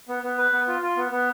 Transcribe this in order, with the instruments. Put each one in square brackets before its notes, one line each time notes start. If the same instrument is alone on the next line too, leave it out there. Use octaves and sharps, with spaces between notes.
[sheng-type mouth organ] B3
B3
B4
B3
F4
F4
B3
B3